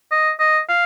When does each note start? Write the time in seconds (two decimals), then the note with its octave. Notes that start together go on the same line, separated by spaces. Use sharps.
0.11 D#5
0.40 D#5
0.69 F5